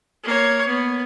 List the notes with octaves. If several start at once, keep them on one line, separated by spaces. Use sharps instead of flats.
A#3 C#5
B3